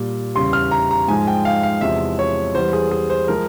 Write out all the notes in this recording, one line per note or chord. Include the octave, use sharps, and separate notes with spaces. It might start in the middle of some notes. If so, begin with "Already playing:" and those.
Already playing: A#2 G3
E2 C#3 G3 C6
F6
A#5
A#5
G#2 F3 G#3 G#5
G5
F5
F5
E2 C3 F3 G#3 E5
C#5
E2 E3 G3 C5
G#4
G#4
C5
F3 G#3 A#4